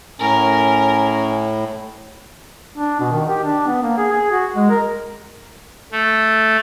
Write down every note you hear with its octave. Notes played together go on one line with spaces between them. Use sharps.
A2 C#4 A#4
D4
B2
D#3
G4
D4
B3
A#3
G#4
G#4
F#4
G#3
A#4
A3